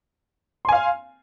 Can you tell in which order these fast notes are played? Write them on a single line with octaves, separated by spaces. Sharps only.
C6 G#5 F5